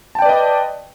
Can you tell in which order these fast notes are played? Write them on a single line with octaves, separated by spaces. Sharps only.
A5 G5 D5 B4 D#5